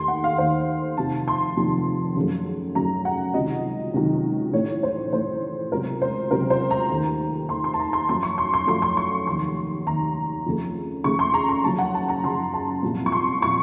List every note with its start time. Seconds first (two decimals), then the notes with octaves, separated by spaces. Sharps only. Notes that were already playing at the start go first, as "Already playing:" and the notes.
Already playing: D#2 D#3 A3 C6
0.08 F#5
0.24 F5
0.38 D#2 D#3 A3 C5
0.97 F1 F2 C3 D#3 A5
1.28 C6
1.57 F1 F2 C3 D#3
2.15 F#2 C#3 F#3 A3
2.75 F#2 C#3 F#3 A3 A#5
3.05 F#5
3.34 C#2 C3 D#3 F#3 D#5
3.94 C#2 C3 D#3 F#3
4.52 A1 A2 A3 C#5
4.83 C5
5.12 A1 A2 A3 C5
5.71 C#2 C3 F#3 A#4
6.02 C5
6.31 C#2 C3 F#3 A#4
6.50 C5
6.71 A#5
6.90 D#2 D#3 A3
7.49 D#2 D#3 A3 C6
7.64 C6
7.74 A5
7.79 A#5
7.93 C6
8.09 F#2 F3 A3 C6
8.23 C#6
8.38 C6
8.54 C6
8.67 F#2 F3 A3 C6
8.82 C6
8.97 C#6
9.26 F1 D#2 D#3 C6
9.86 F1 D#2 D#3 A#5
10.46 F2 C#3 A3
11.04 F2 C#3 A3 C#6
11.19 C6
11.34 A#5
11.49 A#5
11.64 F#1 F#2 C#3 F3 A5
11.78 F#5
11.94 A5
12.09 A#5
12.23 F#1 F#2 C#3 F3 C6
12.54 A5
12.82 C2 A#2 F3
13.06 C#6
13.12 C6
13.42 A#2 F3 C#6